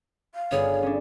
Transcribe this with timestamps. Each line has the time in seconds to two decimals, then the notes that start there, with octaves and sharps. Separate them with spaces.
0.35 F5
0.51 G1 B3 G#4 C#5
0.83 C#4 D4